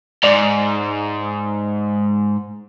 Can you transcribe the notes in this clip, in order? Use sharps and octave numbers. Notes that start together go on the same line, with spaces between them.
G#2 D5